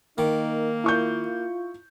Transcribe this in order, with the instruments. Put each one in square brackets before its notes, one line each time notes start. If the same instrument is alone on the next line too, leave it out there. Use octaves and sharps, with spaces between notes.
[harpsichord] D#3 [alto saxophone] A#3 [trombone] D#4
[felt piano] E4 C#6 G6 [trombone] F4